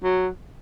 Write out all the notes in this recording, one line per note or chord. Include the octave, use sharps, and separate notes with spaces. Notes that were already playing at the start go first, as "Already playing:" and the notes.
F#3